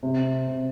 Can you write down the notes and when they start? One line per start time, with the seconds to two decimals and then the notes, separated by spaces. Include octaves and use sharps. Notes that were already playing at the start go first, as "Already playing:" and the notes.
0.03 C3
0.47 C3